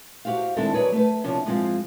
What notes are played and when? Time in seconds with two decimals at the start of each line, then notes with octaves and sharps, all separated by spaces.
0.25 F#4 G4 C5 F5
0.57 D#3 G#3 C4 D4 E4 A4
0.74 F#3 G#4 B4 C#5 D5
0.92 A3 B4
1.24 C3 F3 C#4 D4
1.45 G#2 F3 G#3 C4 F4